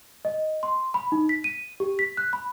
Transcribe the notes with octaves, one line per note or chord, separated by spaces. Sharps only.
D#5
C6
B5
D#4
B6
D#7
G4
B6
F#6
B5